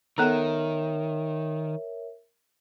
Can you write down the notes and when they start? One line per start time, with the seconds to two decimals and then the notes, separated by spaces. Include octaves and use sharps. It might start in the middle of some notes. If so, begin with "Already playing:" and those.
0.18 D#3 B3 A4 A#4 C#5 E5 A#5